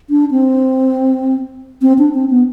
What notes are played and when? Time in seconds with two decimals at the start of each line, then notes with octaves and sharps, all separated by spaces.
0.10 D4
0.31 C4
1.82 C4
1.98 D4
2.14 C4
2.30 B3